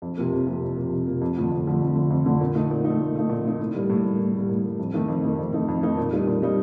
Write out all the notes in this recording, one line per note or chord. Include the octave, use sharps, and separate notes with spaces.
F2
C3 F3 A#3
F2
C3 F3 A#3
F2
C3 F3 A#3
F2
C3 F3 A#3
F2
D3 F3 A3
F2
D3 F3 A3
F2
D3 F3 A3
F2
D3 F3 A3
A#2
A3 D#4
A#2
D#4
A3
A#2
A3 D#4
A#2
A3 D#4
A2
G3 A#3
A2
G3 A#3
A2
G3 A#3
A2
G3 A#3
F2
D#3 A3 D#4
F2
D#3 A3 D#4
F2
D#3 A3 D#4
F2
D#3 A3 D#4
A#2
G3 A#3 D#4
A#2
G3 A#3 D#4